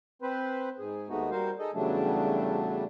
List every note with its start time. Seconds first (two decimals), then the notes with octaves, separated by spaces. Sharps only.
0.22 C4 B4 C5
0.79 G#2 G#4
1.09 D#2 G#3 A3 B3 D#4 F#4
1.31 G3 F#4 A#4 C5 F5
1.59 D#4 G#4 A4 D#5
1.74 E2 C#3 F#3 G3 A3 D4